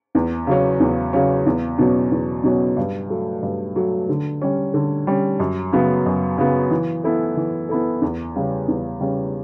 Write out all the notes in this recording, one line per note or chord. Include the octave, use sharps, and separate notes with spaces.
E2
C#3 F#3 C#4
E2
C#3 F#3 C#4
E2
B2 F#3 C#4
E2
B2 F#3 C#4
G2
F#3 A3
G2
F#3 A3
D3
G3 C#4
D3
G3 C#4
F#2
C#3 F#3 B3
F#2
C#3 F#3 B3
E3
B3 E4 A4
E3
B3 E4 A4
E2
C#3 G3 C#4
E2
C#3 G3 C#4